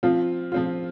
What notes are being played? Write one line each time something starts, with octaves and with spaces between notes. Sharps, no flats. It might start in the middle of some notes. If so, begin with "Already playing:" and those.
F3 C4 F4
F3 C4 F4